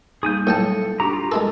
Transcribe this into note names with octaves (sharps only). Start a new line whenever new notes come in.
G3 A#3 D#4 G#4 G#5 G6
A2 F#3 G3 A4 G5 A5
D4 F#4 G4 A#5
F4 G4
G#3 E4 A4 A#4